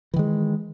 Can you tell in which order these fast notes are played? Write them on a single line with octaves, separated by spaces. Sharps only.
E3 D#3 G#3